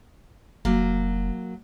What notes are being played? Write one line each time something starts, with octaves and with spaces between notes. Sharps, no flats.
F1 F#3 A#3